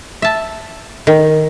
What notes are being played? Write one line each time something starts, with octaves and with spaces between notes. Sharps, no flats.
E5 A5
D#3